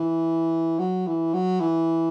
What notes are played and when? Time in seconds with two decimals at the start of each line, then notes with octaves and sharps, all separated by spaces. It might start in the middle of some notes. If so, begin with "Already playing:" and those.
Already playing: E3
0.79 F#3
1.07 E3
1.34 F#3
1.60 E3